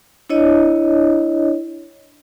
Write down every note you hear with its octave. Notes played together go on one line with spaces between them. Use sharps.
D4 E4 C#5 D#5